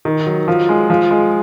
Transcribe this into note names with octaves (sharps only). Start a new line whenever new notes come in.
D#3
F#3
F3
G#3
F3
G#3